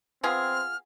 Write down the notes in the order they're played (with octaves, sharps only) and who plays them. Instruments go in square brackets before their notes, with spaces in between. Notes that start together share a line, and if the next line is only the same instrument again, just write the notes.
[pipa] B3 F4 G#4 [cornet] C4 [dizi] F6